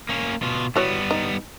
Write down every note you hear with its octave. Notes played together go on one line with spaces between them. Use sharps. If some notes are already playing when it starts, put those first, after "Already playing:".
A#3 C#4
B2 F4
E3 G3 B3 F#4 C#5
D#4